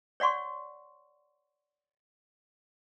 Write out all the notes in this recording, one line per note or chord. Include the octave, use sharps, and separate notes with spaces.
C#5 D5 F#5 C6 C#6